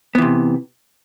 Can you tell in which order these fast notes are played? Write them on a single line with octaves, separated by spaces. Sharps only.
B3 E3 C3